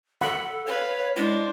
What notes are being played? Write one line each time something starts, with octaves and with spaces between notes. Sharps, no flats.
A4 F#5 B5
B4 C#5 F5
G#3 D4 E4 C5